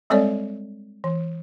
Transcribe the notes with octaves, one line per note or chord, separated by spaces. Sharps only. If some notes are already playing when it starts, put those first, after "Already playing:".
G3 G#3 C4 A4 C#5 D5
E3